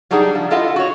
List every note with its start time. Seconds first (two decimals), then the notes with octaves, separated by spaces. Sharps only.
0.11 F#3 G3 D4 D#4 G#4 F#5
0.35 F3
0.50 E4 F4 A4 D#5 F5 F#5
0.76 F#4 C#5